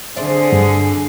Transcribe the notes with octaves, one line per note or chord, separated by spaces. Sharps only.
D3 C4 G#4 D5 E5
G2